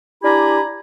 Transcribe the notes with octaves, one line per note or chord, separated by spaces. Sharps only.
D4 E4 G4 G#5 A#5 B5